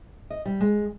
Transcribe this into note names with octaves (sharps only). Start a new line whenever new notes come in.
D#5
G3
G#3